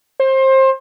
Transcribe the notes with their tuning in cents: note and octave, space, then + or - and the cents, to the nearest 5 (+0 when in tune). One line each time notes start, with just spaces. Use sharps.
C5 +25